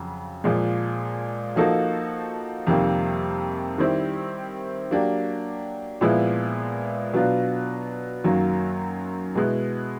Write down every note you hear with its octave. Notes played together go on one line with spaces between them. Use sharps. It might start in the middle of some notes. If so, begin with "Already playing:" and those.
Already playing: F2 C#3 F#3
A#2 F3 G#3
F3 A#3 D#4 F#4 A4
F2 C3 D#3 G3 A#3
D#3 G3 C4 E4 G4
F#3 A#3 D4 G4
A#2 F3 G#3 B3 E4
B2 F#3 B3 D4 F4
F#2 D#3 F#3 A#3
B2 G#3 B3 E4